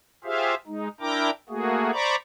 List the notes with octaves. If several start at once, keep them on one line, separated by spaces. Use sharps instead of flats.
F4 G4 G#4 C5 E5 F5
G#3 D#4
D4 E4 A#4 G5 A#5 D6
A3 A#3 F#4 G#4
C5 D5 A#5 B5 C#6 D6